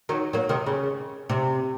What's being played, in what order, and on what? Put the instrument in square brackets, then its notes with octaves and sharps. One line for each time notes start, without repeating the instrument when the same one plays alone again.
[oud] D#3 F#3
F#3 A#3
C3 D#3
C#3
C3